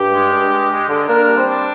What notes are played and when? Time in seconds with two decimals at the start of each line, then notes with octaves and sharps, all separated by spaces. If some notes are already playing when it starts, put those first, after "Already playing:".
Already playing: G2 G4
0.12 G#3
0.32 G2
0.51 G#3
0.70 G#3
0.89 D3
1.08 A#3 D4 A#4
1.28 G3
1.37 C4 C5
1.47 D4